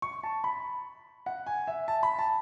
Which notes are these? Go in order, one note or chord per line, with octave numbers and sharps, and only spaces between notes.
C#6
A5
B5
F#5
G#5
E5
A5
B5
A5